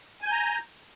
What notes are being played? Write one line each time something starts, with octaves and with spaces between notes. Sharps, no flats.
G#5 A#5 G6